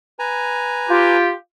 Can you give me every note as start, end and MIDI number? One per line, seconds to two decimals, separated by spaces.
0.19 1.17 71
0.19 1.17 80
0.19 1.17 82
0.90 1.29 65
0.90 1.29 67